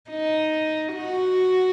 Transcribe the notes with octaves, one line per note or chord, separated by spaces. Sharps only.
D#4
F#4